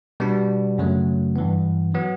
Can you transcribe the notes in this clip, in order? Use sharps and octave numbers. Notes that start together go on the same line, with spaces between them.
B2 G3 B3 D4
F#2 C#3 F#3 A3
G2 E3 B3
F#3 B3